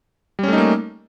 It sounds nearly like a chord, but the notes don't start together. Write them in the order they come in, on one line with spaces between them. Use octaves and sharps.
G3 C#4 A3 D#4 A#3